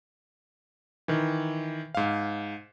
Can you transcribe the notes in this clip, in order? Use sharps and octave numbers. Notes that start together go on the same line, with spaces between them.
D#3 E3
G#2 F5